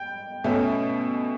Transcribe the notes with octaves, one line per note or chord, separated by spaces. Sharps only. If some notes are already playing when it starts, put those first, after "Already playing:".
Already playing: G5
B2 A3 C#4